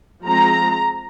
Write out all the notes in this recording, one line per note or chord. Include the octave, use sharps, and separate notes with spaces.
F3 G#3 C4 A#5